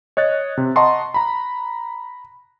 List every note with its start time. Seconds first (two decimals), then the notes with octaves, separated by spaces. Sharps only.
0.17 C#5 D#5 F#6 A6
0.57 C3
0.76 D#5 F#5 A5 A#5 C6 C#6
1.14 A#5 B5